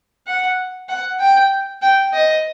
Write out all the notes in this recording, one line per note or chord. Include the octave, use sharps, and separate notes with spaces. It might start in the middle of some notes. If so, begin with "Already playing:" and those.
F#5
F#5
G5
G5
D#5